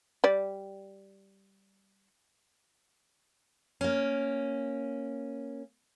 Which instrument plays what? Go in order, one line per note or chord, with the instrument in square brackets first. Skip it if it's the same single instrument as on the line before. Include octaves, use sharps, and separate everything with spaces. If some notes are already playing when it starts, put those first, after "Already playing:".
[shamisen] G3 D5
[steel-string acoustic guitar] A#3 C#4